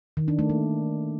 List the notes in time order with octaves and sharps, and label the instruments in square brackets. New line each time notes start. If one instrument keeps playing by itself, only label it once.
[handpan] D#3
D4
A3
A#3